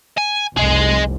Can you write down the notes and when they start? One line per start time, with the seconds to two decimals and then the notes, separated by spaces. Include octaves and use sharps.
0.18 G#5
0.57 F1 C2 G#4 D#5